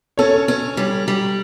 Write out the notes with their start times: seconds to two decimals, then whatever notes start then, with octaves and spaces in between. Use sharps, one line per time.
0.17 C#4 A4 C#5
0.48 C#4
0.77 G3
1.08 G3